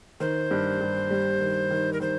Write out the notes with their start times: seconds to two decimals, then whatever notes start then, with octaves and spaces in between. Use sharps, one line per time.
0.20 D#3 C5
0.51 G2
0.80 G2
1.10 G3
1.40 D#3
1.71 D#3
1.93 A#4
2.00 D#3 C5